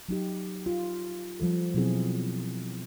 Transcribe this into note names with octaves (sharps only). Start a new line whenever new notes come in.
F#3 D#4 G4
F4
F3 G3 A4
B2 F#3 B3 C4 E4 G#4